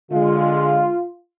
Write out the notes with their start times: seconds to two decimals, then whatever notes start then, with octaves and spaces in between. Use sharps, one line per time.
0.12 D3 G#3 F4